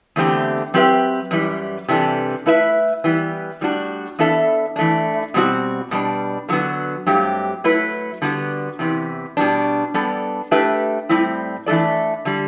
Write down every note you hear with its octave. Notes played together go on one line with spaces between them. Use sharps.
E2 D3 A3 C4 G4
F#3 C4 G4 B4 E5
F#2 E3 G3
C3 E3 G3 D4 A4
A3 E4 B4 E5
E3 G3 B3
A2 G3 D4 F#4
E3 B3 D4 A4 E5
E3 A3 D4
B2 G3 C4 F#4
B2 G3 D4
D3 F#3 B3 F#4
G2 F#3 A3 C4 G4
F#3 A3 E4 B4
D3 G3 B3 F#4
E2 C3 E3
B2 G3 D4
G3 B3 D4 A4
A3 D4 G4 B4 E5
A2 G3 C4 E4
E3 A3 D4 A4 D5
D3 G3